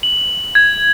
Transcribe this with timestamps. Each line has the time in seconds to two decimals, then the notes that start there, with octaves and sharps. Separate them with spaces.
0.03 F#7
0.55 G#6